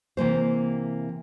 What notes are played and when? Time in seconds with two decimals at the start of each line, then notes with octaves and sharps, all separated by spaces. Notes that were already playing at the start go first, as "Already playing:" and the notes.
0.17 C3 E3 A#3 C5